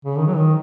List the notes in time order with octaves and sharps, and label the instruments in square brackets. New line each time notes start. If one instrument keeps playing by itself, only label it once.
[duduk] C#3
D#3
F#3
D#3